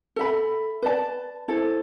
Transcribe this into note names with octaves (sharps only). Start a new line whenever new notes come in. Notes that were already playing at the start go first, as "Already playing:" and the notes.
A4 E5 B5
B4 D5 A5
E4 A4 C5